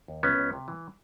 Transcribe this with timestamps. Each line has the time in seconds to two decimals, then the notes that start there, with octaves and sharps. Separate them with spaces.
0.08 D#2
0.23 C#2 B3 C#4
0.38 C#2
0.53 C3
0.68 E3